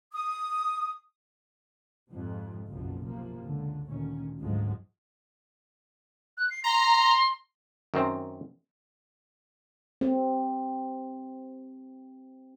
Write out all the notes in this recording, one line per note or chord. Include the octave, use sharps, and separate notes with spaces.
D#6
F2 G#2 C3
F#1 B1 F#2 C#3 F3
C3 F3 A#3
C#2 D3
D2 A#2 D#3 C#4
D2 G#2 F3 F#3 G#3
F#6
C7
A#5 C6
F#2 D#3 C4
C4 G4